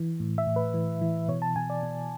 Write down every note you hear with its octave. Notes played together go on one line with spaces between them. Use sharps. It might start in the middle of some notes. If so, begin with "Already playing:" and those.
Already playing: E3
A2
E5
A2
B4
E3
E3
B2 C#5
A5
B2 G#5
D5
B2